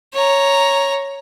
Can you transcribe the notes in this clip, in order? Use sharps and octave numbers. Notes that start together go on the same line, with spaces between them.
C#5 A#5